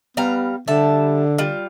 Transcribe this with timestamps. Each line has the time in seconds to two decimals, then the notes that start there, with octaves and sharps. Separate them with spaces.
0.17 G3 B3 F5 A#5
0.68 D3 G3 E5 A5
1.38 G3 F4